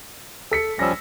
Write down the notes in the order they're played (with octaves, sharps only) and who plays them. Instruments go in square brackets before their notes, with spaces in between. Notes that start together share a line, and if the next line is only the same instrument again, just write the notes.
[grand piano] A4 B6 C#7
[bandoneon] F3 G3 C#4 [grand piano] E6 A#6